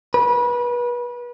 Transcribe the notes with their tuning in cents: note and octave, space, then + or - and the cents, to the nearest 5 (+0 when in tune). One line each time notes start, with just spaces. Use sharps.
B4 -30